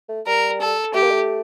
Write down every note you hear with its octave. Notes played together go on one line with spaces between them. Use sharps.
A3
G3 A#4
A4
A3 G4
A#3
A3